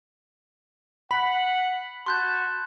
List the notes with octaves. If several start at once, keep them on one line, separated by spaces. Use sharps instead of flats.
F#5 B5 B6 F#7
F#4 A5 C6 F#6 G6